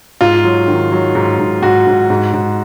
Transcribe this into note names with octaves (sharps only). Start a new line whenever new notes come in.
G#2 F4
F#3
D#3
F#3
G#2
G#2
G#2 F#4
G#2
G#2
G#2